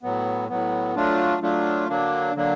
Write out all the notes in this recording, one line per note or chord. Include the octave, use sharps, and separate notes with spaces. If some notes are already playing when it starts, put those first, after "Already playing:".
A2 F#3 B3
A2 F#3 B3
F#3 A3 D4 F4
F#3 A3 D4 F4
D3 F#3 A#3 D4
D3 F#3 A#3 D4